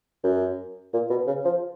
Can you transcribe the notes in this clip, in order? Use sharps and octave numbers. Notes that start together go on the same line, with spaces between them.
F#2
A#2
B2
C#3
F3